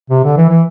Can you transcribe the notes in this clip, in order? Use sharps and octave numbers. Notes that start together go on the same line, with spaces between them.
C3
D3
E3
E3